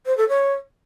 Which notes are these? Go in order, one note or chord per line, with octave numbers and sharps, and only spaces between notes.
C5
A4
C#5